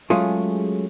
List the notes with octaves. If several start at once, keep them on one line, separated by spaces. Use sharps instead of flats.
F#3 G#3 A3 C#4 F4 G#4